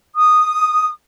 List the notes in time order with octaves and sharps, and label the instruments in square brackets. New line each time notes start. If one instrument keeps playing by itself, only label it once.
[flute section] D#6